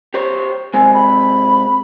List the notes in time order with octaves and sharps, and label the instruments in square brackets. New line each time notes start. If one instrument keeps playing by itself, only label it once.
[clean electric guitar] G4 C5 C#5
[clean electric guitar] C3 G#3 C4 [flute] G#5
[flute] B5